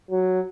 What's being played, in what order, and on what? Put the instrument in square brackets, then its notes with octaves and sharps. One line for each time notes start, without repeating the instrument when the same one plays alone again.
[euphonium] F#3